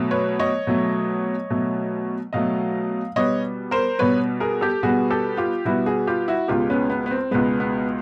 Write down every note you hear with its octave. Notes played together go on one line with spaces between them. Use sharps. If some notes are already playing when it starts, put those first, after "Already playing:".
Already playing: B2 F#3 A3
B4 C#5
C#5 D#5
B2 F#3 A3
B2 F#3 A3
B2 F#3 A3 D#5 F5
B2 G3 B3 C#5 D#5
A#4 C5
B2 G3 B3 B4 C#5
G#4 A#4
G4 A4
B2 G3 B3 F#4 G#4
G4 A4
F4 G4
B2 G3 B3 E4 F#4
F#4 G#4
F4 G4
E4 F#4
C#2 B2 G#3 F4 G4
B3 C#4
B3
B3
C4
C#2 B2 G#3 B3
B3